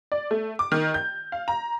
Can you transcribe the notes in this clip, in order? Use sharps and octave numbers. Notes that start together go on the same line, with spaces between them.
D5
A3
D6
D#3
G6
F5
A#5